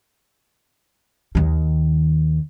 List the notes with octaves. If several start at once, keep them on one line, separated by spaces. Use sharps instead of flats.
D#2 D#3